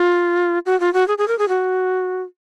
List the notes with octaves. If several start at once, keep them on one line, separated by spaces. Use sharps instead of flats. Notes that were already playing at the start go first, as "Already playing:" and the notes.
Already playing: F4
F#4
F4
F#4
G#4
G#4
A#4
G#4
F#4